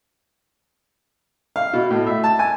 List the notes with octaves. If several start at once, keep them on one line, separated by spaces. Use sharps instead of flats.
F5
B2
A2
E5
A5
G#5